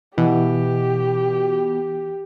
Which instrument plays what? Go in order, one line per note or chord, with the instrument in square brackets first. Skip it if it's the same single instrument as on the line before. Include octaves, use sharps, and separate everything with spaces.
[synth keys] B2 [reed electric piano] E3 [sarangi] G4